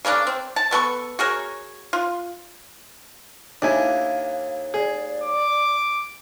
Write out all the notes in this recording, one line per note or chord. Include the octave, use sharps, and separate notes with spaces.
C#3 A#3 C#4 D4
C4
A5
A3 B3 A4 C#6
F#4 G#4 A#4 C#5
F4
D#2 D4 E4 F5 G#5
G#4 D5
D6